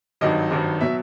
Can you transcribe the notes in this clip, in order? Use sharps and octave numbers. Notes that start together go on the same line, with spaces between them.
G#1 G2 D#3 F#3 D#5
G#1 G2 D#3 F#3
B2 F#3 E5